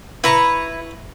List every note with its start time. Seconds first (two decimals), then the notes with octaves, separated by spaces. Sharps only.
0.24 E4 B4 A#5 B5 C#6